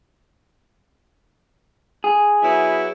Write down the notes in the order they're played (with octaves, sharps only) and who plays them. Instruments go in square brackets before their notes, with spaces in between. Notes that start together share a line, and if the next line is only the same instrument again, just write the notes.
[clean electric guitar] G#4
[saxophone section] F#3 B3 E4